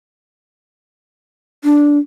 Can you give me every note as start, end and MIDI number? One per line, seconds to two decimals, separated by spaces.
1.64 1.98 62